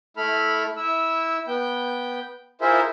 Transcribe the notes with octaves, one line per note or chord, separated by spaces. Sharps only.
A3 E4 A4 B5 F6
E4 E6
B3 G5 G6
E4 F4 G#4 A#4 C5 E5